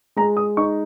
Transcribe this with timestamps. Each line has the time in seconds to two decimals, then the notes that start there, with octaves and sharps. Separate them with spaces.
0.16 G#3 A#5
0.37 D#6
0.57 D#4 C#6